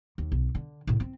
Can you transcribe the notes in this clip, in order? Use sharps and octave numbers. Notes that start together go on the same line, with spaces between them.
D#2
B1
D3
A2 C#3
C4